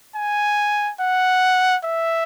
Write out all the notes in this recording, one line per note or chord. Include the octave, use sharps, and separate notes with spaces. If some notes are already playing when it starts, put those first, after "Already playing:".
G#5
F#5
E5